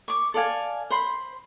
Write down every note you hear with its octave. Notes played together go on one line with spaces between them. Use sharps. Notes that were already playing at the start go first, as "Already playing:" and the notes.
C#6 D6
A4 D5 F5 G#5
C5 B5 C6